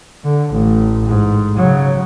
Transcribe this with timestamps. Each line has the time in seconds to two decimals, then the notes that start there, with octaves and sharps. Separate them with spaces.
0.24 D3
0.53 A1
1.06 G#2
1.57 C#3 F#3